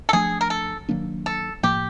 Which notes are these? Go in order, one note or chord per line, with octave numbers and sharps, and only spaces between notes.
A4
F3 A3 D4 G#4
A#4
A4
D#3 F#3 A#3 D4
A4
A2 F3 A#3 G4